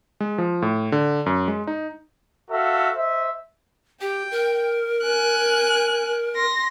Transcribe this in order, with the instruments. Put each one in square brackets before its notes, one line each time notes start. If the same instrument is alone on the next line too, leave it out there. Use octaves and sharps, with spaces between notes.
[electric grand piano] G#3
F3
A2
D3
F#2
G#3
D#4
[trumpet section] F#4 A4 E5 F5
C5 D#5 E5
[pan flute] G4 [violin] G5
[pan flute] A#4
[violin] G#5 F#6
C6 A#6